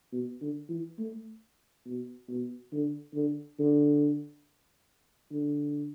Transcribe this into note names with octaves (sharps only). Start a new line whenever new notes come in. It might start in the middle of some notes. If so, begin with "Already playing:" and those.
B2
D3
E3
A3
B2
B2
D3
D3
D3
D3